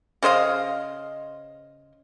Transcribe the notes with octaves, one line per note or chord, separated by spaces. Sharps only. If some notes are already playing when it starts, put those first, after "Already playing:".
C#3 C5 D#5 F5